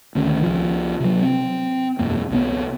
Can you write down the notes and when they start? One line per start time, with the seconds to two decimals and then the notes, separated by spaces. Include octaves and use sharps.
0.15 D2 D#3 C#4
0.42 C2 F3
1.00 C3 F#3
1.22 C4
1.99 E1 C2 F#2 A#3
2.30 C2 F#3 B3